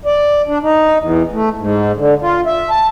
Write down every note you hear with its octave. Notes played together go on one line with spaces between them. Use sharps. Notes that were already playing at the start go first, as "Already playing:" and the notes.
D5
D4
D#4
E2
A3
G#2
D3
F4
E5
A5